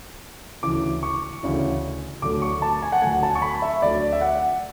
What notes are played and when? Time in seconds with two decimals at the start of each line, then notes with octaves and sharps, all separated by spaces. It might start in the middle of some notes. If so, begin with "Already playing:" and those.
0.63 D2 C#3 E3 D6
1.03 C#6
1.43 D2 C#3 E3
2.22 D2 D3 F#3 A3 D6
2.42 C#6
2.62 A5
2.83 G#5
2.92 F#5
3.02 D2 D3 F#3 A3 G#5
3.23 A5
3.35 C#6
3.42 B5
3.62 E5
3.82 D2 D3 F#3 A3 D5
4.13 E5
4.21 F#5